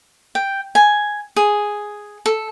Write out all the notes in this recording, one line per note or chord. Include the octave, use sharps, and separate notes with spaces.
G5
G#5
G#4
A4